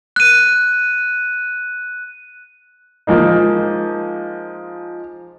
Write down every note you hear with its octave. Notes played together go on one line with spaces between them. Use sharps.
F#6 D#7
F3 G#3 A#3 D#4